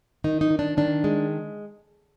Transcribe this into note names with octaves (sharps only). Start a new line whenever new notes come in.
D#3 D#4
D#4
D#3
D4
D#3 D4
G#3